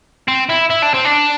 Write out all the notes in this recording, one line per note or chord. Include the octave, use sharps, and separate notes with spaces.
C4
E4
E4
D4
C4
D4